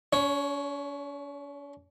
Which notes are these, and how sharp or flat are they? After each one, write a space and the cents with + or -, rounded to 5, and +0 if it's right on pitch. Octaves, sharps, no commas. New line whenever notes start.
C#4 +45 C#5 +0